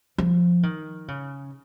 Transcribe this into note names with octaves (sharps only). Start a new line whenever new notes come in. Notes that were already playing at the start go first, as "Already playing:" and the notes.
F3
D#3
C#3